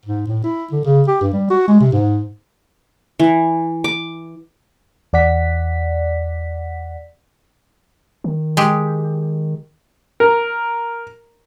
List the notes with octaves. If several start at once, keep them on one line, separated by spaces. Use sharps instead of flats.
G#2
A2
E4
D3
C#3
G4
G2
G3
F#4
G#3
C3
G#2
E3
D6
E2 D5 F#5 B6
D#3
G#3 G4
A#4